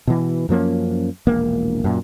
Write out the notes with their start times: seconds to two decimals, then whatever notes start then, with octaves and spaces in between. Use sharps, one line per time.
0.07 B2 E3
0.49 F#2 F3 A#3 C#4
1.27 E1 A#1 A#3
1.84 F#2 A#2